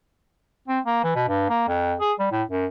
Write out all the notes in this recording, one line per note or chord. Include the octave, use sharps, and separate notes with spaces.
C4
A#3
E3
B2
G2
A#3
F2
G#4
G3
A2
F#2